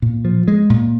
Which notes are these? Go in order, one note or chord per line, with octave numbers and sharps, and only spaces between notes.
A#2
F3
G#3
A#2